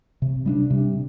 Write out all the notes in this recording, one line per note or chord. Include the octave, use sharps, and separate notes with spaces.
C3
G3 B3 D4
C3